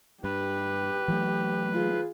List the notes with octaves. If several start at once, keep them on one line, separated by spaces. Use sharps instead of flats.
G2 G4 B4
E3 F#3 A3
F4 G#4